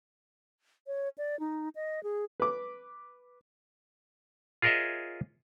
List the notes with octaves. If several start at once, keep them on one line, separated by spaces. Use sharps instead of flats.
C#5
D5
D#4
D#5
G#4
B4 D6
F4 G#4 A#4 C#5 D#5 E5